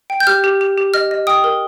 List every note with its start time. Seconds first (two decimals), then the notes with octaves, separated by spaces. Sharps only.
0.10 G5
0.20 G6
0.27 G4 F6
0.44 G4
0.61 G4
0.78 G4
0.94 D#5 F6
1.11 D#5
1.27 G5 D#6
1.44 A#4